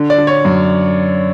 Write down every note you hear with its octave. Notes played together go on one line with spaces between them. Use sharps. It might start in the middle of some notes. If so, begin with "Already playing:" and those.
Already playing: D3
D5
D3
C#5
F#2